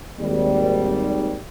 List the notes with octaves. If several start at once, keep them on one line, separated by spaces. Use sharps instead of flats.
G#1 D#2 G3